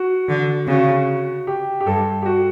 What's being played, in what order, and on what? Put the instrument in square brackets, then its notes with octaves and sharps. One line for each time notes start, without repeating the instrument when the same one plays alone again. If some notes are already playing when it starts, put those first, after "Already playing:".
Already playing: [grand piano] F#4
[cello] D3
[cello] C#3 [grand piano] F#4
[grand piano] G4
G4
[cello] G2 [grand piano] A4
[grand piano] G4
F#4